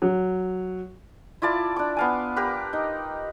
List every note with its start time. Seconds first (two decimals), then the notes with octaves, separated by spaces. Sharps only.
0.02 F#3
1.42 E4 F4 D5 A5
1.76 D4 D6
1.97 B3 F5 G#5
2.36 G4 A#4 B4
2.73 D#4